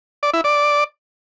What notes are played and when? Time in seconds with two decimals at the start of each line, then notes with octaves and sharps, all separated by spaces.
0.23 D5
0.33 E4
0.44 D5